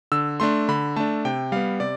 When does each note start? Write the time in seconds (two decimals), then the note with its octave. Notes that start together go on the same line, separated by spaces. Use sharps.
0.12 D3 E6
0.40 A3 D4 C6
0.68 D3 B5
0.96 A3 D4 A5
1.25 C3 G5
1.52 G3 B3 F5
1.80 C3 D5